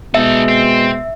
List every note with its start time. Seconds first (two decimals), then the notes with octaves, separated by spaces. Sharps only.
0.15 B2 G#3 D#4 A4 E5
0.48 C4